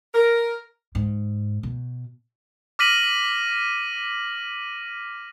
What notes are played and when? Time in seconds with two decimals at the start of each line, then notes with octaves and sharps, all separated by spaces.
0.14 A#4
0.95 G#2
1.63 B2
2.79 D6 F6 A#6 B6 D#7 F#7